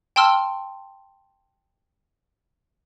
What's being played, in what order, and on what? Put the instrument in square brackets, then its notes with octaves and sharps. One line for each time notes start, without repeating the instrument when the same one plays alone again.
[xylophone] G5 A5 C6 E6 F6